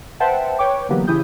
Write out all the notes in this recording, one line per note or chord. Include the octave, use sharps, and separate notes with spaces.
B4 C5 E5 F#5 G5 A5
B4 C#5 G5 C#6 D6
D3 E3 F#3 A#3 B3 G4
C#3 E3 E4 G4 D#6 G6